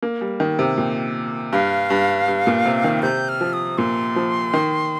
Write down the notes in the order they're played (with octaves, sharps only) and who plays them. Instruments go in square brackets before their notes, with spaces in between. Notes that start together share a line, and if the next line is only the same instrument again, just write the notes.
[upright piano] A#3
G3
D#3
C3
A#2
[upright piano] G2 [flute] F5
[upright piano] G2
G2
A#2
C3
D#3
[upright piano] C3 [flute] G6
[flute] F6
[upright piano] F3
[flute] D#6
[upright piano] A#2 [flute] C6
[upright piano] F3
D#3